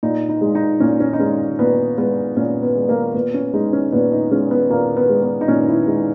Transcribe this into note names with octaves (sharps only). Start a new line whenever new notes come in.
A#2 D#4
D#4
G#3
D#4
A#2 C#4
C#4
D#4
G#3 C#4
A#2 B3
G#3 B3
A#2 C#4
B3
G#3
A#3
A#2 B3
C#4
G#3 D#4
C#4
A#2 B3
D#4
G#3 C#4
B3
A#2 A#3
B3
G#3
B3
D#4
A#2 C#4
E4
G#3 D#4